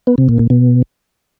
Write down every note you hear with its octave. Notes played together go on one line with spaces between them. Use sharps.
B3
C3
A#2
A#2
B2